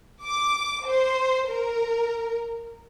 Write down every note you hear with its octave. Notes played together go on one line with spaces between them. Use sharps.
D6
C5
A#4